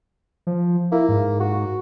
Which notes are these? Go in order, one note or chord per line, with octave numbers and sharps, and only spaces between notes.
F3
A#3 E4
G#2
F#4